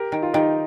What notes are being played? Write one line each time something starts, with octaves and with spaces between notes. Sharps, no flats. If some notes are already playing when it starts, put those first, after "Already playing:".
Already playing: G4 A#4
D#3
F4
D#3 D#4 G4